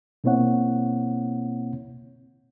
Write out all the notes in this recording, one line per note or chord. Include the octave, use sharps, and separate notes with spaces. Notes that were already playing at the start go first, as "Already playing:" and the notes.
B2 A#3 C4 E4 C#5 F#5